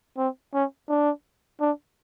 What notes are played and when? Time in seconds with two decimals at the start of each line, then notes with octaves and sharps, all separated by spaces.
0.17 C4
0.54 C#4
0.89 D4
1.61 D4